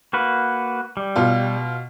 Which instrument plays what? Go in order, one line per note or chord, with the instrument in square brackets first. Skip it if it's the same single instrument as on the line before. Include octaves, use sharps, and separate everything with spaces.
[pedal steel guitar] A#3 F#4 B4
G3
[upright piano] B2 F4